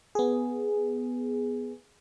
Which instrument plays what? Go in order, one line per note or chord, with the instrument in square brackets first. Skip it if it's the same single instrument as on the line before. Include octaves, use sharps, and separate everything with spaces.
[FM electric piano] B3 G#4